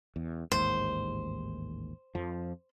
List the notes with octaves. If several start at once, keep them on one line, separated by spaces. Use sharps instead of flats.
E2
A1 D#2 G#2 C5
F2 F3